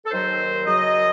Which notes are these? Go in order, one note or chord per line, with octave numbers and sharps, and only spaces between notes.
A4
D#2 D#3 F#3 C5
F#2 C#3 F#3 D#5